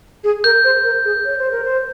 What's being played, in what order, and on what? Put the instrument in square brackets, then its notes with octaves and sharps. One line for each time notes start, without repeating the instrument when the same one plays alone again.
[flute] G#4
[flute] A#4 [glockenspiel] G6
[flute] C5
A#4
G#4
C#5
C5
A#4
C5